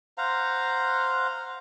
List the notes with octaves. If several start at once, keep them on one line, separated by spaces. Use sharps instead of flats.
C5 F5 F#5 A#5